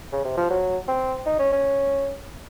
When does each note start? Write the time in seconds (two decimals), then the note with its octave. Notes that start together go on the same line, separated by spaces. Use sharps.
0.12 C#3
0.25 C3
0.37 F3
0.50 F#3
0.88 C4
1.26 D#4
1.39 C#4
1.52 C#4